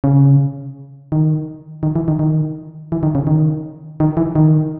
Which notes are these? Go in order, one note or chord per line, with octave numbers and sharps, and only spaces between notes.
C#3
D#3
D#3
E3
D#3
D#3
E3
D#3
C#3
D#3
D#3
E3
D#3